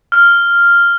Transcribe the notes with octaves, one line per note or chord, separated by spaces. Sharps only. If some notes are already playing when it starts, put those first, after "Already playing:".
F6